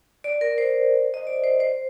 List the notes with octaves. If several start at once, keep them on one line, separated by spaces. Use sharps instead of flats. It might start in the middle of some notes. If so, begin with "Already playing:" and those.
D5
A#4
C5
D#5
D5
C5
C5